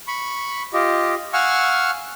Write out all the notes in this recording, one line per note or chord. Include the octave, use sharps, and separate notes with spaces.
B5 C#6
F4 G4 D#5
F5 F#5 G#5 C#6 E6 F6